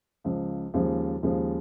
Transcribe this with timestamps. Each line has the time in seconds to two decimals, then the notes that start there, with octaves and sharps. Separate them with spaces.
0.24 C#2 C#3 F3
0.74 D#2 C#3 F3 G#3
1.23 D#2 C#3 F3 G#3